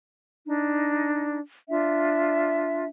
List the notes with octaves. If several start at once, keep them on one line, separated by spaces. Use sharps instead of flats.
D4 D#4
D4 F4 E5